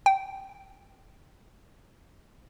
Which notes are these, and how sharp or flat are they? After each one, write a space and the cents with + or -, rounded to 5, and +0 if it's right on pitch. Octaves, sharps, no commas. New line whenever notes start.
G5 -20